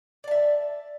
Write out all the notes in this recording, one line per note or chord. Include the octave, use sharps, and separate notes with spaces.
D5 E5 A5